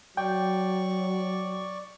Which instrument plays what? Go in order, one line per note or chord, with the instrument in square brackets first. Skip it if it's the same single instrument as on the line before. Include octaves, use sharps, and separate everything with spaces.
[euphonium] F#3 [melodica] D5 C#6 [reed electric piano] G5